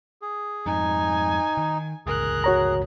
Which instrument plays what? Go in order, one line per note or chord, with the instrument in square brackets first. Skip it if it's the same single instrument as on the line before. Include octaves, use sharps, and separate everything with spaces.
[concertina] G#4
[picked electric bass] F2 G#2 [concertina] D#4 [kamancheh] G#5
[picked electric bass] D#3
[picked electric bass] G1 C#2 [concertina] G#4 [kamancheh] A#4 F#6
[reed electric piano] F#4 C#5 A#5